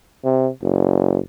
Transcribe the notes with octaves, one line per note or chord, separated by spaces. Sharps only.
C3
F#1